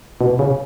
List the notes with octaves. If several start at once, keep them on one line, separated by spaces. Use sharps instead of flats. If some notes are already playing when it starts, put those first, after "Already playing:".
B2
C#3